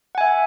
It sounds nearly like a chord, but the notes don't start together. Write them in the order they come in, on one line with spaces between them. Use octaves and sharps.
F#5 G#5 E5